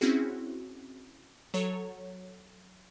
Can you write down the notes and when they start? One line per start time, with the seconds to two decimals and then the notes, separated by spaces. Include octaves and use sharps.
0.01 C4 C#4 E4 F#4 G#4
1.54 F#3 A4 C#5